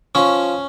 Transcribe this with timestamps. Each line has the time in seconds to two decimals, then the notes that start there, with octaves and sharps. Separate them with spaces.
0.15 F3 C#4